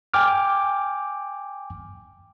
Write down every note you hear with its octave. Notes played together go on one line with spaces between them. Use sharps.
G5 G#5 D6 F6